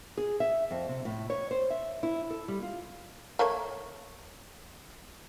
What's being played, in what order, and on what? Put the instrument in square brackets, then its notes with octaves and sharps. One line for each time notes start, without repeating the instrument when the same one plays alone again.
[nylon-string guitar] G#4
E5
F2
C3
A2
C#5
C5
E5
E4
A4
G3
F4
[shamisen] A3 A#3 C#5